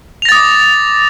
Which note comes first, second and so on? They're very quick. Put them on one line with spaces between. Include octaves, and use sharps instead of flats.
F7 A#6 A6 D#6 D6